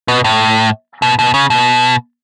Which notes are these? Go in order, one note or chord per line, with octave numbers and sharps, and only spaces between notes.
B2
A2
B2
B2
C#3
B2